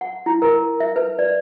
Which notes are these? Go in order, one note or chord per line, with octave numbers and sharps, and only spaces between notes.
F#5
E4
A#4
E5
B4
D5